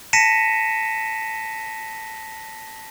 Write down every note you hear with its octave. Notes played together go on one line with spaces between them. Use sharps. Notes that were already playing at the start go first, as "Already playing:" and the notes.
A5 A#6 B6 C#7 D#7 E7